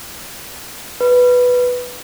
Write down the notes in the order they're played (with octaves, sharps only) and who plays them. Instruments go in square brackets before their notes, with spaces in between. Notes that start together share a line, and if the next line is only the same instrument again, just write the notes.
[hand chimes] B4